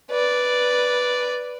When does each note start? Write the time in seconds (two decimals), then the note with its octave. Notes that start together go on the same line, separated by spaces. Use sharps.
0.11 B4 D5